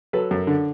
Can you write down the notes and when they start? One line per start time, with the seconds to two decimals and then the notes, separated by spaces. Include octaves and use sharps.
0.13 F#3 A4 B4
0.31 F#2
0.47 D3